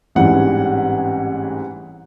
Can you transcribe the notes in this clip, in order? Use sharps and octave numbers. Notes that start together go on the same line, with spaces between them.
A1 G#2 E3 G3 C4 F#5